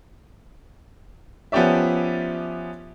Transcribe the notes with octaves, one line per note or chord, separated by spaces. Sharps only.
F3 B3 C#4 G4 D5 E5